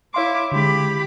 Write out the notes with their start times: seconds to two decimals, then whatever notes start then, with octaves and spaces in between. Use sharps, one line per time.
0.14 E4 C#5 F5 C6 D6
0.52 D3 G#3 G4 B5